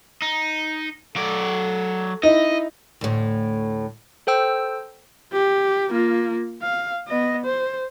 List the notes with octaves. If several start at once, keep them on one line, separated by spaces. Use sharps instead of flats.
D#4
F#3 A4 D5
D#4 E4 D#5
D2 A2
A4 C5 G5 E6
G4
A#3 F4
F5
B3 D#5
C5